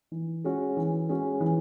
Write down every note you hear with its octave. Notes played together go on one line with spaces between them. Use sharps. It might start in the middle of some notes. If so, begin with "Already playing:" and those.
E3
G#3 C#4 F#4
E3
G#3 C#4 F#4
E3